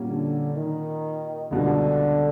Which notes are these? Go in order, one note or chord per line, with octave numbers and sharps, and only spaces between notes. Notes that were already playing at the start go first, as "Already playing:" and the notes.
Already playing: A#2 G3 A#3 C#4 F#4
D3
D#3
C#2 B2 D3 G3